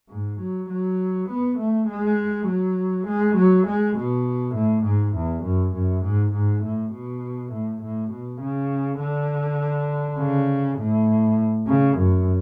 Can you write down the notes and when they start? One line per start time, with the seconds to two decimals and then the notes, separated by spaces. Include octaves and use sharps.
0.09 G#2
0.39 F#3
0.69 F#3
1.29 B3
1.58 A3
1.88 G#3
2.47 F#3
3.06 G#3
3.36 F#3
3.66 G#3
3.96 B2
4.54 A2
4.84 G#2
5.15 E2
5.43 F#2
5.74 F#2
6.03 G#2
6.33 G#2
6.63 A2
6.92 B2
7.52 A2
7.82 A2
8.11 B2
8.41 C#3
9.00 D3
10.19 C#3
10.78 A2
11.67 C#3
11.97 F#2